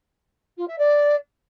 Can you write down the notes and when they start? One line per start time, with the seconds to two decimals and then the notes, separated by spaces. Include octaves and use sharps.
0.57 F4
0.68 E5
0.78 D5